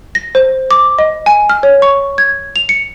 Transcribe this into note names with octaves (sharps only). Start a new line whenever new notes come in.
A#6
C5
D6
D#5
G#5
F6
C#5
C#6
G#6
F7
C#7